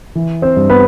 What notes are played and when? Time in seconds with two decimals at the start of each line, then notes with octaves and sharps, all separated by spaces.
0.15 E3
0.42 C4 C5
0.57 G2
0.69 B3 B4